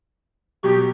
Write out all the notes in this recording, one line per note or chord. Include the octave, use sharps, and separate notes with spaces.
B2 F#3 G4 C#6